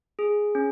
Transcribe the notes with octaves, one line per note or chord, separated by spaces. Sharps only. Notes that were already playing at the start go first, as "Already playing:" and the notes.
G#4
C#4